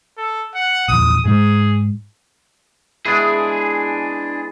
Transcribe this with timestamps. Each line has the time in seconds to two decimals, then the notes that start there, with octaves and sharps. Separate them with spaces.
0.17 A4
0.55 F#5
0.88 A#1 E2 D#6
1.25 G#2 G#3 G#4
3.05 E3 G#3 B3 D4 G#4